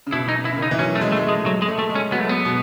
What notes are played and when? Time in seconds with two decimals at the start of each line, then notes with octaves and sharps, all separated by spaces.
0.07 C#3
0.12 B2 E4
0.29 D#4
0.45 E4
0.52 C#3
0.57 D#3
0.62 D#4
0.71 E3
0.79 F#3 C#4
0.95 A3
1.01 G#3
1.12 A3
1.16 G#3
1.23 A3
1.28 G#3
1.45 F#3 A3
1.62 G#3
1.68 A3
1.79 A3
1.89 G#3
1.95 C#4
2.12 F#3 B3
2.20 A3
2.29 B3
2.45 B2